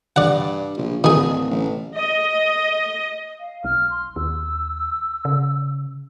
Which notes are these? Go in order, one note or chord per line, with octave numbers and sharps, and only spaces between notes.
G2 D5 F#5
A#1
D1 D#3 G#4
A1
D#5
F5
B1 F6
C6
D#2 E6
C#3